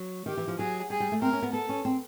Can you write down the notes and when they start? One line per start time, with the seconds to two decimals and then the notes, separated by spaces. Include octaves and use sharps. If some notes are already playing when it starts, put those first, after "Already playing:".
Already playing: F#3
0.26 D#3 G4
0.37 E3
0.48 F3
0.58 F#3 G#4
0.90 G3 G#4
1.00 G3
1.12 A3
1.22 C4 A#4
1.33 C#4
1.42 B3
1.53 B3 A4
1.69 C#4
1.85 C4